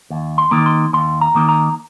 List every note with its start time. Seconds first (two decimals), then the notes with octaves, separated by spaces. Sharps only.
0.10 D#2
0.38 C6
0.51 D#3 A#3 D#4
0.66 C6
0.94 D#2 C6
1.21 A#5
1.35 D#3 A#3 D#4
1.49 A#5